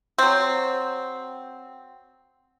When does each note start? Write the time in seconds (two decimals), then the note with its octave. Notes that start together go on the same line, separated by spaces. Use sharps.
0.18 F#3 C4